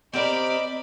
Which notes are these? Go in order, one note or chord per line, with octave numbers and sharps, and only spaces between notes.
C4 G4 A#4 D5 D#5 B5